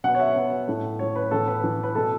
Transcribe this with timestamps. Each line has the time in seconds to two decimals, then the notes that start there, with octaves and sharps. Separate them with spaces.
0.04 B2 B3 F#5
0.15 C#5
0.20 E5
0.36 B2 B3
0.68 A2 A3
0.99 A2 A3 C#5
1.16 B4
1.31 A2 E3 B3 A4
1.48 B4
1.63 A2 E3 B3
1.83 B4
1.95 B2 A3 A4